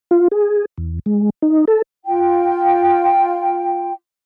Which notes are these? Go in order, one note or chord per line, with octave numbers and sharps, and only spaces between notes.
F4
G#4
E2
G#3
D#4
A4
F4 G5